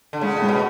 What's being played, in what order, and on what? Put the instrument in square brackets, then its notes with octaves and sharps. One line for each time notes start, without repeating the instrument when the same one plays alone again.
[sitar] D3
[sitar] C#3 [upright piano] G#3
[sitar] A2
[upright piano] G#3
[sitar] B2